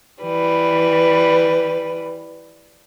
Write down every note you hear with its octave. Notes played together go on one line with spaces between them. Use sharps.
E3 G3 B4